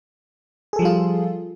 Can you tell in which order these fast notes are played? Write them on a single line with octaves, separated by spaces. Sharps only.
G#4 A4 F3 G3 F4